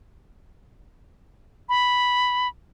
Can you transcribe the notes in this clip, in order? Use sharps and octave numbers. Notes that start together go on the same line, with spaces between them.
B5